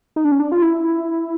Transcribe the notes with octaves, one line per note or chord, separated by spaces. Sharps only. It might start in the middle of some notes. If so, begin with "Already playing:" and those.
D#4
D4
C#4
D4
F4
E4